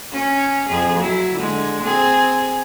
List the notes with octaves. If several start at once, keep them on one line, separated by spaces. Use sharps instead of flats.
C#4
F2 G#4
F#3 E4
D3 G#3
C4 G#4